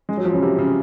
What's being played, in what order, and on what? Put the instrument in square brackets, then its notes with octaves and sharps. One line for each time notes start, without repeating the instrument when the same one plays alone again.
[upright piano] G#3
F#3
F3
C#3
C3
C#3